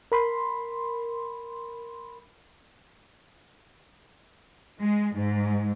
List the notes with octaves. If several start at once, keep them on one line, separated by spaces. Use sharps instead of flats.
A#4 B5 C6
G#3
G#2